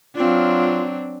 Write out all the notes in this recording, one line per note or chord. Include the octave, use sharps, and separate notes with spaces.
F#3 C4 D4 F4